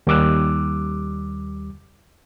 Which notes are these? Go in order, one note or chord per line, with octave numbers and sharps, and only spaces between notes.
D#2 G3 D6 E6 F#6